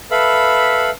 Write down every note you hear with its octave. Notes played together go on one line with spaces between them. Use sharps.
A4 B4 E5 F5 B5